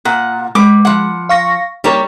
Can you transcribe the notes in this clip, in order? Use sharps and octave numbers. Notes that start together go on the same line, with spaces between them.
A#2 F#5
G#3 B4 D6
F3 F#5
F5 C#6 A#6
G3 A#3 D#4 A#4 C#5